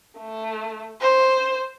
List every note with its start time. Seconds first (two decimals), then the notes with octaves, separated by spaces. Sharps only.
0.19 A3
1.01 C5